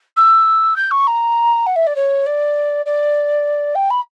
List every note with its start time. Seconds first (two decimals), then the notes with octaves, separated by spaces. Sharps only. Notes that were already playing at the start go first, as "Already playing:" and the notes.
0.17 E6
0.76 G6
0.91 C#6
1.07 A#5
1.66 F#5
1.76 E5
1.87 D5
1.96 C#5
2.26 D5
2.86 D5
3.75 G5
3.90 B5